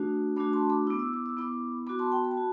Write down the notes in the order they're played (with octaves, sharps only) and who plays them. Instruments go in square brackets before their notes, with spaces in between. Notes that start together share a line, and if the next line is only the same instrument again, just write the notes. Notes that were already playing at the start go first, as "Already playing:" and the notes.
Already playing: [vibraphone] A3 D4 F#4
A3 D4 F#4 B5 D6
A5 C6
B5 D6
B3 E4 D6
E6
D6
E6
B3 E4 B5 D6
B3 F#4 B5 D6
A5 C6
G5 B5
B5
A5
F#4